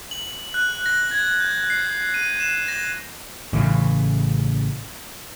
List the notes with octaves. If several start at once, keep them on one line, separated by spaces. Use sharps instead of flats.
F#7
F#6
A#6
G#6
G6
C7
D#7
E7
A#6
A1 C#3 E3